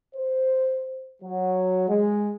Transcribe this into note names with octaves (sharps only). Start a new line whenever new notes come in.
C5
F#3
G#3